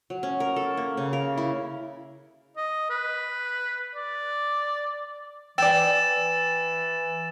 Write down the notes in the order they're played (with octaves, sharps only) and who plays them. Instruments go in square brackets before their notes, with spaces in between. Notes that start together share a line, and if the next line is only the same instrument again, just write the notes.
[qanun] F#3
C#4
A#4
A4
A#3
C#3
A#4
E4
[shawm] D#5
B4
D5
[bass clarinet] E3 [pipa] D5 G5 [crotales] E6 A6 E7